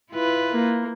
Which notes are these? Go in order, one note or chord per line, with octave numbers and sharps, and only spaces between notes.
E4 F4 B4
A#3